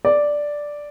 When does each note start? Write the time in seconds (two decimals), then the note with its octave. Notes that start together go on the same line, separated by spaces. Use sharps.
0.05 D5